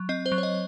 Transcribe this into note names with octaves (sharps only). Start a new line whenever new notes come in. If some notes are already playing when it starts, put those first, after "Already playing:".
Already playing: F#3
C4 D#5
C5
F#3
C#5
D#5